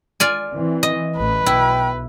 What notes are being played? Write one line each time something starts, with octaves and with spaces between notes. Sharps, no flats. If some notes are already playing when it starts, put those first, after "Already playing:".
F4 D5 G#5
E3 C4
D#5
A1 B4
B1 E4 G5